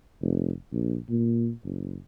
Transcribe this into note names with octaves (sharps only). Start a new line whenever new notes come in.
F1
A#1
A#2
F#1